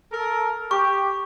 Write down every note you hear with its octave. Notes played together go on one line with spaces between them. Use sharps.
A4 A#4
G4 C#6